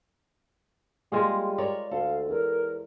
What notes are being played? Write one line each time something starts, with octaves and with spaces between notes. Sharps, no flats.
G3 G#3 A#3 F4 G#4
A#4 C#5 D5
D2 A4 F5
E2 A#4